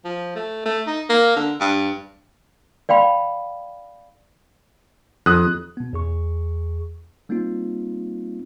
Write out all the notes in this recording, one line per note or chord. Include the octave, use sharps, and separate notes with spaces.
F3
A3
A3
D#4
A#3
D3
G2
D5 F5 G5 B5
F2 D#6 F#6
B2 B3
E2 G#4 C#6
G3 A#3 C4 D#4 F4